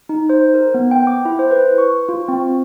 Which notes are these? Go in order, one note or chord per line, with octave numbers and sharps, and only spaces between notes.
D#4
C5
A#4
B3
G5
D6
E4
C5
B4
C#6
F4
C4